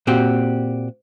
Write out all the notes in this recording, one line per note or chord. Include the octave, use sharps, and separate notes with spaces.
A#2 C4 F#4 G4